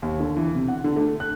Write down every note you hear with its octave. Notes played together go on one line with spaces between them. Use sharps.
D#2
D3
E3
C3
F#5
D3
A3
F#6